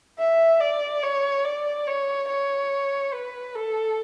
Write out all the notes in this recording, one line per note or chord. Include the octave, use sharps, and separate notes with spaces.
E5
D5
C#5
D5
C#5
C#5
B4
A4